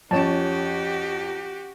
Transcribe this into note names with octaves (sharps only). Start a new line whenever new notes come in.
F2 C#4 F#4 G4 C#5 A5